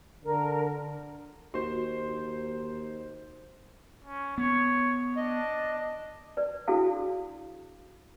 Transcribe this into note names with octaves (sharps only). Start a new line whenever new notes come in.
D3 A#4
D#2 F#4 C5 C6
C#4
B3 C#5
D4 D#5
B4 D5
D4 E4 F#4 G#4 A4 F5